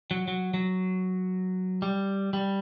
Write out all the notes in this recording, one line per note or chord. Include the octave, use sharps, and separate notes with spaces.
F#3
F#3
F#3
G3
G3